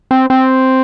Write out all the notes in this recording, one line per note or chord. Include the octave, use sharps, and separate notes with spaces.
C4
C4